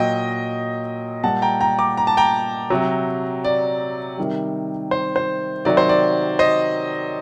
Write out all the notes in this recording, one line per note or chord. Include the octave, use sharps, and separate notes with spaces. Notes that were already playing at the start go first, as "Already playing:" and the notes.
Already playing: A#2 F#3 D#5 G5
A#2 G3 F#5 A5
G5 A#5
G5 A#5
A#5 D6
A#5
A5
G5 A#5
C3 F#3
D5
C3 D#3 G3
C5
C5
C3 D#3 F#3 D5
C5
D5
C5 D#5